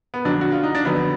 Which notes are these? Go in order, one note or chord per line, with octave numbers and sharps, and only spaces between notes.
B3
F2 D3 F#3 D4
F#4
F4
D#4
D4
F2 D3 F#3 B3